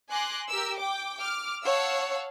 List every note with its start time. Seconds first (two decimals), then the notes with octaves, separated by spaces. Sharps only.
0.10 G#5 C6 D6 F#6 A#6
0.50 G4 A#4 E6
0.80 G5 D6
1.19 D6 F6
1.63 C#5 F5 F#5 A5 E6